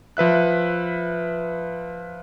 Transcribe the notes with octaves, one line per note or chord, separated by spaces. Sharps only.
F3 B4 E5 F#6